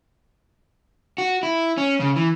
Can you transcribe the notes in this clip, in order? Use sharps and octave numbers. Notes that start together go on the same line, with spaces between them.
F#4
E4
C#4
C#3
E3